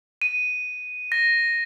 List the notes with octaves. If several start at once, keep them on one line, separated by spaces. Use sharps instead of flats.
D#7
A#6